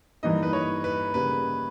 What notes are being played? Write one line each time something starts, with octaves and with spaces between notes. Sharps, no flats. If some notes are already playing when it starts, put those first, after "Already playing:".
G2 E3 A#3 D#4 D#5
B4
C#5
B4
C#3 G3 A#3 B4